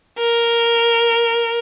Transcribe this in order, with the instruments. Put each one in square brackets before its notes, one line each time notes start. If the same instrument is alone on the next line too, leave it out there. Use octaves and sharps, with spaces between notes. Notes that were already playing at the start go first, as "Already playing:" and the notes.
[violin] A#4